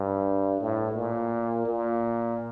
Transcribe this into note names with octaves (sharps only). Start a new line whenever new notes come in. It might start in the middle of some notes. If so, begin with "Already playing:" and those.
Already playing: G2
A2
A#2
A#2